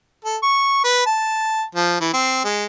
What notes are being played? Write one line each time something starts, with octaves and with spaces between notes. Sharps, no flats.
A4
C#6
B4
A5
F3
E3
C4
G#3